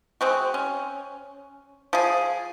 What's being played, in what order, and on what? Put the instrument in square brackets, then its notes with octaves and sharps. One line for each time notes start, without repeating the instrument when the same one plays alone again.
[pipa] G#3 C4 F#4
C#4
F3 G#4